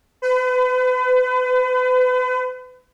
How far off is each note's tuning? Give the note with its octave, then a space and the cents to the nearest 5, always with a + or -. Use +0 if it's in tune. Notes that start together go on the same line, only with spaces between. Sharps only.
B4 +40